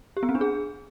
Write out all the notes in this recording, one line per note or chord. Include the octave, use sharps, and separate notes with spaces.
G4
B3
C4
D4
G#4